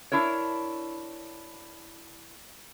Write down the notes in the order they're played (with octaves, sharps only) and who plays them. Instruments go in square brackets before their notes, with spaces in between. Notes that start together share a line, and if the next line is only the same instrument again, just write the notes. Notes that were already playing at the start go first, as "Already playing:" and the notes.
[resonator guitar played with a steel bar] D4 E4 A#4 C#5